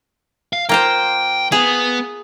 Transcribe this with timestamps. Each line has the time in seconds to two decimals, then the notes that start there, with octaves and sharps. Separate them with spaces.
0.53 F5
0.69 A#3 F4 C5 G5
1.52 B3 G#4